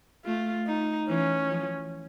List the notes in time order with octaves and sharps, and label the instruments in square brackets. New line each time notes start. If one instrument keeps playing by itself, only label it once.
[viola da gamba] A3 [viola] F4
[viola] D#4
[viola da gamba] E3 [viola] C#4
[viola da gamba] F3